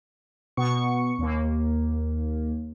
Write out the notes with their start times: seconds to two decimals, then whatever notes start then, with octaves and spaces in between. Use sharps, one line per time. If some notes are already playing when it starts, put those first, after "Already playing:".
0.57 B2 B3 C#6 C#7
1.19 D#2 A#3